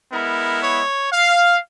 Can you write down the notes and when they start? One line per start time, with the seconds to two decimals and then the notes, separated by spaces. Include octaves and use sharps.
0.11 G#3 B3 E4 A#4
0.62 C#5
1.12 F5